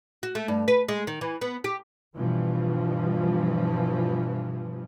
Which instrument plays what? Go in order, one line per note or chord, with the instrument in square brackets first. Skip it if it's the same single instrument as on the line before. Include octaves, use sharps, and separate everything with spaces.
[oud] F#4
A3
G2
B4
G#3
D#3
E3
B3
G4
[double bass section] G2 B2 E3 F3